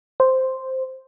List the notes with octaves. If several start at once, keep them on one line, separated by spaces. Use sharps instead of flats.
C5